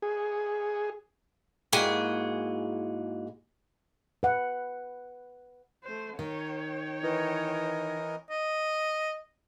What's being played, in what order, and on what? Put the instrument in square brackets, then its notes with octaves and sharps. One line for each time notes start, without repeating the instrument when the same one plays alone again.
[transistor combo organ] G#4
[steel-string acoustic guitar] G#2 A#3 E4 F#4 G#4 G5
[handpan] B4 F#5
[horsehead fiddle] A3 C5
[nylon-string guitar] D#3 [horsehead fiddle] C#5 G5
[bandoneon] E3 A#4 D#5 [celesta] E4 B4
[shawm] D#5